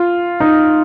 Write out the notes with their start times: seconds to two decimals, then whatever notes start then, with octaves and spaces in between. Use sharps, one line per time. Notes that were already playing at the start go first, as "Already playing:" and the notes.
Already playing: F4
0.40 D#4